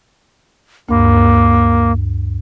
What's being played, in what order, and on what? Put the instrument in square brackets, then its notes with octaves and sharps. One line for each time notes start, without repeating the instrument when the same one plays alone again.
[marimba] D2 G2 [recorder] A#3